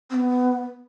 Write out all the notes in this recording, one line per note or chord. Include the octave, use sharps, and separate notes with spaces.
C4
B3